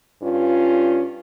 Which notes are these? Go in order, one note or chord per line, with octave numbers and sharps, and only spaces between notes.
G2 C#4 F4